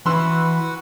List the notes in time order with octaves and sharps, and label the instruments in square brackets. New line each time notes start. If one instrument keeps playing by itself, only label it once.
[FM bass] E3 [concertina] F#4 B4 F#5 [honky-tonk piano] B5 C6 E6